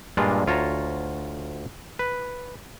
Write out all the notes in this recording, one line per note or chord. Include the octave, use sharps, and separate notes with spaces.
G2 A#2 G#3 D4 F4
D2 F4 C#5 A5 A#5
B4